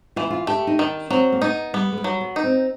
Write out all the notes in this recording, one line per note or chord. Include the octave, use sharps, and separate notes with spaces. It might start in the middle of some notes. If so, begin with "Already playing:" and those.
E3 F4
E4
F4
A3 G4
D#4
D#3 D4
F#3 C4
A#3
B3 D#4
G3 B3
G#3
G3
F#3
B3
D#4
C4